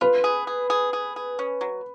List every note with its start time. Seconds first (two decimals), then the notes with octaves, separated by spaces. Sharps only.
0.01 F4 B4
0.24 G#4
0.47 G#4
0.70 G#4
0.93 G#4
1.16 G#4
1.39 C#4
1.61 F#3